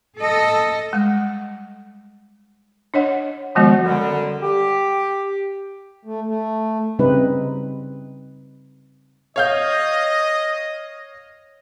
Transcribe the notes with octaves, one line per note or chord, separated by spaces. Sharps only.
A4 D#5
G3 G#3
D4 C#5 D#5 F#5
D#3 F3 G#3 B3 F#4 D#5
F#2 D3 G3
G4
A3
A3
C#3 G3 C4 D#4 B4
C#5 D#5 F5 G6